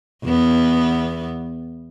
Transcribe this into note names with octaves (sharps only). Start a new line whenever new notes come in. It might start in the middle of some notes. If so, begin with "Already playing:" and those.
E2 B3